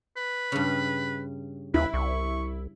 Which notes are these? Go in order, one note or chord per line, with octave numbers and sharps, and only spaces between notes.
B4
G2 C#3
D#2 E4 B4
C2 C#6